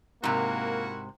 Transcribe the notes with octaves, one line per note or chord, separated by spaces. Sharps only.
G#2 C3 A#3 E4 F#4 A#4